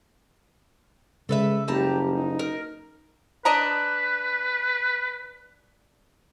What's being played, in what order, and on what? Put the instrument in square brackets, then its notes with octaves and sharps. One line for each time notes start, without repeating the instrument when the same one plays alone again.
[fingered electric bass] C#3 [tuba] G#3 [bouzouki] A4 B4 E5
[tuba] F#1 [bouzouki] G3 A5 A#5 [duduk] G4
[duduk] D#4
[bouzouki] A#4
[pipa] D4 D#5 A#5 [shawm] B4